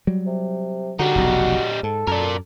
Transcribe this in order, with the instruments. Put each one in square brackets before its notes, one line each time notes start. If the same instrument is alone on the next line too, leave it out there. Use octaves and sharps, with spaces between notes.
[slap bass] F#3 G3
[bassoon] C3
[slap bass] D3 [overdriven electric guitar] G3 D#4 [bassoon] F#4
[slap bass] F1 B1
[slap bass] G#2 [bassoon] A4
[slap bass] F#2 [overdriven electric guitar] A#4 D5